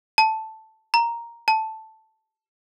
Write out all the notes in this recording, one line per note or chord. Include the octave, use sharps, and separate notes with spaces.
A5
A#5
A5